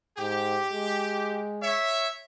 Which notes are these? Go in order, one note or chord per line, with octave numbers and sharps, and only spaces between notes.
G#2 G4
G#3
C#5 E5